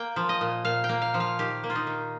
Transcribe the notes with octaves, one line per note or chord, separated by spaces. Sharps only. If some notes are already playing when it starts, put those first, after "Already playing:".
Already playing: A#3 G5
F3
D#5
A#2
A#2 F5
G5
A#3
F5
F3
F5
D#3 G4
A#3
F4
D#4
D#3